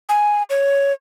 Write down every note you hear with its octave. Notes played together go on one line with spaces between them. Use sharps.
G#5
C#5